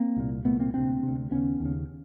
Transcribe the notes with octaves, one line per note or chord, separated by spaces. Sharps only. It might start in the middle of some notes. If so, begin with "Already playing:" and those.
Already playing: A#3 C4
C2 A#2
C2 A#2 A3 B3
A#3 C4
D2 C3 C4 D4
D2 C3
D#2 C#3 B3 C#4
D#2
C#3